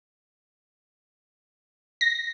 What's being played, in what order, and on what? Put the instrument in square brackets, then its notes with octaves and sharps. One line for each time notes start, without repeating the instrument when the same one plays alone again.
[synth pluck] A#6